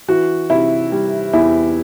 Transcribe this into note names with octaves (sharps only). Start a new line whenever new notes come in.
E3 F#4
C3 E4
G3
E2 E4